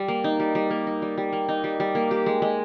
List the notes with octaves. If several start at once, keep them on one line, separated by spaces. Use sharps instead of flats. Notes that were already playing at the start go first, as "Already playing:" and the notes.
Already playing: G3
A#3
D#4
G3
G3
A#3
D#4
G3
G3
A#3
D#4
G3
G3
A#3
G4
G#3
G#3